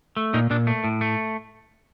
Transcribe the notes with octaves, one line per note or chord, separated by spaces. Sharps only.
A3
A#2 D#4
A#2 D4
A3
A2
A3